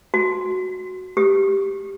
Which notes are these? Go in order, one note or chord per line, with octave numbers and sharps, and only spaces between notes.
F#4
G4